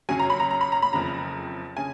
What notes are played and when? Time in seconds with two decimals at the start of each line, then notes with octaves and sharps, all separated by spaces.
0.09 F#2 C#3 F#3 G#5
0.19 A#5
0.30 B5
0.40 A#5
0.51 A#5
0.61 B5
0.72 A#5
0.82 B5
0.93 F#1 F2 C#3 A#5
1.77 C#3 G#5